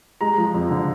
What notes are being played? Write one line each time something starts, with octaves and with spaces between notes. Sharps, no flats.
G#3 A#5
F3
F2
D3